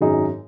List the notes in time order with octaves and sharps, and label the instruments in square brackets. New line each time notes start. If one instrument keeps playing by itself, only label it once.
[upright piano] G#1 F#2 F#3 D#4 G#4